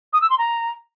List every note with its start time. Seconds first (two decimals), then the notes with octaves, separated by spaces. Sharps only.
0.13 D#6
0.22 E6
0.30 C6
0.38 A#5